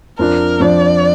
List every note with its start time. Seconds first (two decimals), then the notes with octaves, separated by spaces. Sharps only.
0.19 F2 F3 D4 A#4
0.60 F2 F3 D4 D5